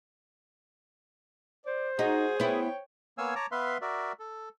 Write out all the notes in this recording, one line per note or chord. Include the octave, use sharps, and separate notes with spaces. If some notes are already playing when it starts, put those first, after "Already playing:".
C5 D5
D#4 F#4 G#4
B3 E4 C#5 G5
A#3 B3 C#5 F5 G#5 E6
C#5 A5 A#5 D6
B3 B4 E5 F5 C6
F#4 A#4 D5 E5
A4